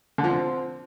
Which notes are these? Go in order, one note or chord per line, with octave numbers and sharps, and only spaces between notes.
D3
F3
C4